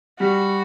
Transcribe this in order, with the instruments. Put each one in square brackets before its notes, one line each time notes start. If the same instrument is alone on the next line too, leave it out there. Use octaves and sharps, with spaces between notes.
[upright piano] G3 [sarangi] F#4